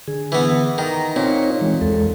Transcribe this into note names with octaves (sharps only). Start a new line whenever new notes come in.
D3 G#4
E3 B3
D#3 A#5
A#2 C4 D#4 C#5
E3 G#3
E2 G#3 A4